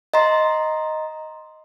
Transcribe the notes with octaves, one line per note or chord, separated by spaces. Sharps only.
D#5 A#5 C6